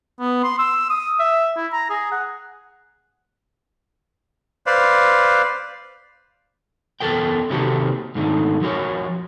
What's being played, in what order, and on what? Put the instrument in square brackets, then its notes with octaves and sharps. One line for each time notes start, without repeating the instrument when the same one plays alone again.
[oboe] B3
C6
E6
D#6
E5
E4
A#5
G#4
F#5
[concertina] B4 C5 D5 F5
[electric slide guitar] E2 F3 A4 A#4 G5
C3 D#3 A#3 F#4 G4 A4
G#2 D3 D#3 A3
F3 F#4 A#4 C#5